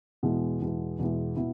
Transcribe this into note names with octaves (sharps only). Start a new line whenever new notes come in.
E2 B2 G#3 B3 E4
E2 B2 G#3 B3 E4
E2 B2 G#3 B3 E4
B2 B3 E4